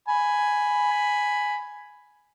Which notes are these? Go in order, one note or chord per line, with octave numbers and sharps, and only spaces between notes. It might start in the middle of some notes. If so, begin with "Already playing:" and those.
G#5 B5